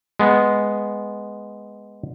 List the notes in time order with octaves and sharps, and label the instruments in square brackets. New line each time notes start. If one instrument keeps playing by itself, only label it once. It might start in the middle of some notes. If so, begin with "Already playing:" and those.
[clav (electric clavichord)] G#3 B3